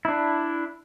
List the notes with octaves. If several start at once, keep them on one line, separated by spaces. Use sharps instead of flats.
D4 E4